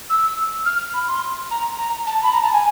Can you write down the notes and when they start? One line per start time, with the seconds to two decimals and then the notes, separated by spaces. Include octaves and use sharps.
0.09 E6
0.65 F6
0.93 B5
1.07 C6
1.50 A#5
1.78 A#5
2.06 A5
2.22 B5
2.32 A#5
2.42 A5
2.52 G#5